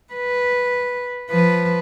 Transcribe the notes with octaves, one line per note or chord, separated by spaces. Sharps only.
B4
F3 B4